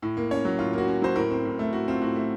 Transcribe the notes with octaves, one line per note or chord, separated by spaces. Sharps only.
A2
A#3
C#4 C#5
F#3
A2 F4
A#3 F#4
C#4
F#3 C5
A2 A#4
C4
A2
A3
A2 F#4
C4 F4
A2 F#4
A3